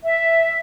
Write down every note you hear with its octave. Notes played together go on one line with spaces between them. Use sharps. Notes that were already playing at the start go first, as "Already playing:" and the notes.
E5